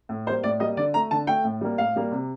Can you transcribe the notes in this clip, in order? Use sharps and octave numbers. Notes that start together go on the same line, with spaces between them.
A2
G3 A#3 C5
A2 D5
G3 A#3 D#5
D3 D5
A3 A#5
D3 A5
A3 G5
A2
G3 A#3
A2 F5
G3 A#3
C3